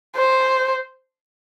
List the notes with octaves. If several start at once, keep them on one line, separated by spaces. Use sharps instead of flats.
C5